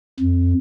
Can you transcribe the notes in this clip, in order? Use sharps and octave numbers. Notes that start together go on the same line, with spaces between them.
F2